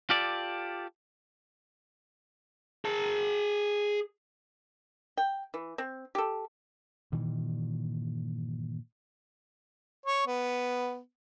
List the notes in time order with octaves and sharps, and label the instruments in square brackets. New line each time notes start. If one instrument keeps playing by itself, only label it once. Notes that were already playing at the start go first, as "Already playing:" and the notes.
[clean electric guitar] F4 G4 A4 D5
[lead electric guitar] G#4 A5
[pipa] G5
E3
C4
G4 A4
[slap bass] G2 A#2 D#3 E3
[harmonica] C#5
B3